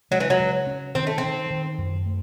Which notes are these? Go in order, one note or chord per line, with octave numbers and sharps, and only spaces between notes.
F#3 G#3
E3
F#3
C#3
C#4
D#3 C4
A3
C4
D#3
D#3
F#2
A3